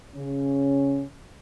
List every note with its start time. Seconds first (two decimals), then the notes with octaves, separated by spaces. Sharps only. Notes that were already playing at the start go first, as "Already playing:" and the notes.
0.16 C#3 C#4